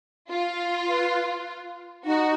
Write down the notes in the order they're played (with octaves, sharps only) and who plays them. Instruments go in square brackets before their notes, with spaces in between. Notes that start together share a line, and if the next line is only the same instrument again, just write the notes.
[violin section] F4
[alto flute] B4
[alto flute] D#4 [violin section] F#4